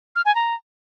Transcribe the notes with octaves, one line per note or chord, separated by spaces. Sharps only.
F6
G#5
A#5